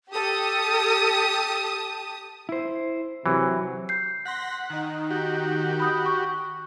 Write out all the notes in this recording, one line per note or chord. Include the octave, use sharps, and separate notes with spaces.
G4 A4 A5 D#6
E4 C5
C3 E3 F#3
G6 C7
F#5 C6 A#6 B6
D#3 D#4
F#4 G4
B5 D#6 G6
C#6